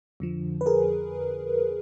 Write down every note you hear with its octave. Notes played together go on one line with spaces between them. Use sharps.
F2 D3 F3
B4
G#4 A#4